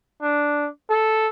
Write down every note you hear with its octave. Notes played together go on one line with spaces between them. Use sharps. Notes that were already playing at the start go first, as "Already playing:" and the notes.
D4
A4